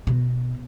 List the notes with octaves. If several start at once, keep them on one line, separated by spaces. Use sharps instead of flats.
B2